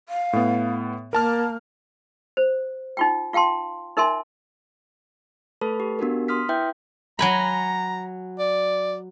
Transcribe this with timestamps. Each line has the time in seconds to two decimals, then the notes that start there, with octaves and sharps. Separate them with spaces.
0.09 F5
0.33 A2 B3
1.13 A#3 A#4 A5 F6
2.37 C5
2.97 D#4 F4 G5
3.33 F4 F5 G5 A5 C6
3.97 D#4 A#4 E5 G#5 C6
5.61 A3 A4 B4 A5 B5
5.80 G4
5.99 B3 D4 F#4 G4 A#4
6.28 C6 D#6 F6 B6
6.49 E4 B4 E5 G5 G6
7.19 F#3 G#5 A#5 B5
8.39 D5